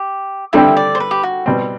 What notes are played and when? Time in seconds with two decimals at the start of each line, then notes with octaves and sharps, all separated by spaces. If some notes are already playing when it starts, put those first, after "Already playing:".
Already playing: G4
0.53 D3 G3 C4 E4 G4 E5
0.77 D5
0.95 C5
1.00 B4
1.11 G4
1.23 F#4
1.46 B2 G3 C4